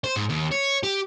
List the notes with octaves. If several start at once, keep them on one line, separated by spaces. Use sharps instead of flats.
C5
G#2
D#2
C#5
G4